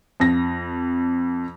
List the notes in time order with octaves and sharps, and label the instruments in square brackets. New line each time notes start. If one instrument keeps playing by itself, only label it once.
[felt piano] F2 A#6